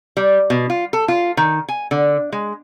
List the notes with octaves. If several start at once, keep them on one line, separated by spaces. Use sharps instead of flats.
G3
B2
F4
A4
F4
D#3
G#5
D3
G#3